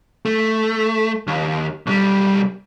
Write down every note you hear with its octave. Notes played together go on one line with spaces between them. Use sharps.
A3
D#2
B1 G3